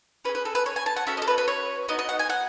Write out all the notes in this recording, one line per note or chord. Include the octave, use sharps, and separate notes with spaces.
C#4 G#4 B4
B4
A4
B4
C#5
G#5
A5
F#5
C#4 F#4 A4 E5
D#5
A4
B4
B4
C#5
B3 D#4 F#4 D#5
D#5
F#5
G#5
F#5